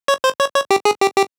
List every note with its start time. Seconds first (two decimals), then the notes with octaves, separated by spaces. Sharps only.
0.08 C#5
0.24 C5
0.40 C#5
0.55 C#5
0.71 G4
0.85 G#4
1.01 G4
1.17 G4